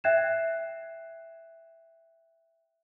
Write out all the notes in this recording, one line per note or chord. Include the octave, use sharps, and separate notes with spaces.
E5 G5 F#6 G#6 C7 E7